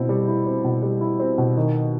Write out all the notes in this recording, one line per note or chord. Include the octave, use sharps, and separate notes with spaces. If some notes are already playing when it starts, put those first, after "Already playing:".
Already playing: B2 C4 E4
G3
E4
C4
B2
G3
E4
C4
B2
D#3